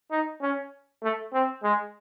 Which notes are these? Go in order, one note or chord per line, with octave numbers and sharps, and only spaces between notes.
D#4
C#4
A3
C4
G#3